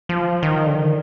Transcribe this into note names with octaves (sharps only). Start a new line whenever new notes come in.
F3
D#3
D3
D#3